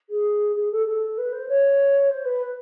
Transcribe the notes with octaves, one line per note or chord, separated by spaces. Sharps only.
G#4
G#4
A4
A4
B4
C5
C#5
C5
B4